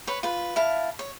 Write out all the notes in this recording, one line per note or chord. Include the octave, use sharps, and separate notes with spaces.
B4 C#5
F4 B4
E4 F5 A5
C#5